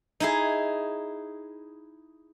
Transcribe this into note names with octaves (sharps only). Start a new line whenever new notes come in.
D#4 E4 G#4